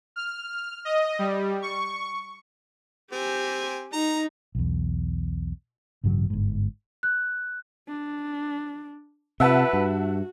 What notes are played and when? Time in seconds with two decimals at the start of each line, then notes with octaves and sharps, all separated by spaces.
0.16 F6
0.85 D#5
1.19 G3
1.62 C#6
3.12 C4 G4 G#5
3.93 D#4 A#5
4.55 B1 E2
6.04 A1 G2 C#3 F#3
6.30 G1 G#2
7.03 F#6
7.88 D4
9.40 C3 F4 B4 E5 F#5 A5
9.73 G2 F#4